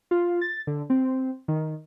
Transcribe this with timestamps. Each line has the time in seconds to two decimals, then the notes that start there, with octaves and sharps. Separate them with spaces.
0.11 F4
0.41 A6
0.67 D3
0.90 C4
1.48 D#3